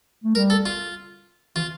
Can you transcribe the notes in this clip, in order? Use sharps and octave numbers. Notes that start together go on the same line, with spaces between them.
A3
G3 A#4
A4
F4
E3 F4